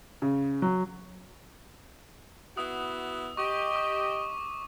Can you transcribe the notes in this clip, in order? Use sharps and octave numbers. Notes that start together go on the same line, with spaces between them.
C#3
F#3
B3 E4 F#4 D#6
G4 D#5 C#6 D6
D6